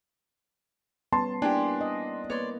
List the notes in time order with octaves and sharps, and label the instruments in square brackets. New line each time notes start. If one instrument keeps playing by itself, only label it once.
[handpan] G3 B3 C#4 [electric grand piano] A5 [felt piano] C6
[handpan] A#3 E4 [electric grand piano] D4 [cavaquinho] G4 G#5
[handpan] D#5
[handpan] A#3 B3 B4 [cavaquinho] C#5 D5 C6